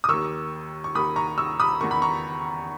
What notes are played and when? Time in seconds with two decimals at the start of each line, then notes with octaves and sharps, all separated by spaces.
0.04 D#6
0.08 D#2 D#3 C#6 E6
0.84 C#6
0.95 D#2 D#3 B5 D#6
1.16 A#5 C#6
1.38 C#6 E6
1.60 B5 D#6
1.81 E2 D#3 C#6
1.91 B5
2.02 A#5 C#6